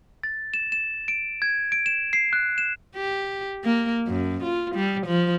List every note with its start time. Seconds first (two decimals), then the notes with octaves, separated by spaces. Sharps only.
0.23 A6
0.54 E7
0.72 E7
1.08 D7
1.42 G#6
1.72 D7
1.86 E7
2.13 C7
2.33 F#6
2.58 E7
2.96 G4
3.64 A#3
4.07 F#2
4.44 F4
4.76 G3
5.06 F3